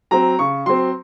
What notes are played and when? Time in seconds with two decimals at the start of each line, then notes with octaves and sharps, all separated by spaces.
0.11 F#3 C4 A#5
0.39 C#3 C#6
0.66 F#3 C4 C6